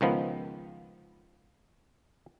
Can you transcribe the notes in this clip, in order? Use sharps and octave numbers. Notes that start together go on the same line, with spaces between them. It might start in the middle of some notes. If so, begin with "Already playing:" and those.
C#2 D#3 F3 B3